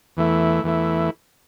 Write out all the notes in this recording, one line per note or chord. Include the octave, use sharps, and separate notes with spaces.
E2 E3 A3 E4
E2 E3 A3 E4